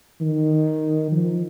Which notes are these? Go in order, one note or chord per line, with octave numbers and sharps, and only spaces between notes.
D#3
F3